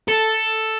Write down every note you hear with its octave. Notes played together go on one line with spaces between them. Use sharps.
A4